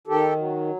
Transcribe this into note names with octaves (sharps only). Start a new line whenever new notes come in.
D#3 G4 A4
F#3